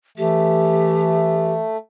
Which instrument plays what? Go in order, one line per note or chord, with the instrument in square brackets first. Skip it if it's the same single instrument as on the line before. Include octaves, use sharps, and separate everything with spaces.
[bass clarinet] E3 [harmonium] A3 [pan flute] G4